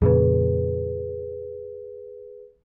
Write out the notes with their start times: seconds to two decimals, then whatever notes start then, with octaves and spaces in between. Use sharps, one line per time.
0.02 F2 A#2 C#3 G#4 B4